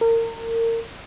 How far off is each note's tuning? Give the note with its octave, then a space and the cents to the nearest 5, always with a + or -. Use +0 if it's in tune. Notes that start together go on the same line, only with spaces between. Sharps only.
A#4 -30